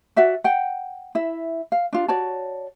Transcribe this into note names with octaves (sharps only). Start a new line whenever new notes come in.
F#4 D5 E5 F#5
F#5 G5
E4 E5
F5
D4 F4
F#4 C#5 D5 A5